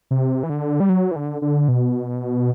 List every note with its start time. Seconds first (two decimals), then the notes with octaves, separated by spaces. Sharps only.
0.11 C3
0.43 E3
0.50 D3
0.80 G3
0.89 F#3
1.11 E3
1.16 D3
1.42 D3
1.68 B2